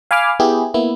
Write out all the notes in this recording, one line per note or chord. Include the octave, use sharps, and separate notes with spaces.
F5 G#5 B5 D6 F6
B3 E4 G4 G#4
A#3 B3 E4